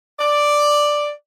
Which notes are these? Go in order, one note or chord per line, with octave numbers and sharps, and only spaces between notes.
D5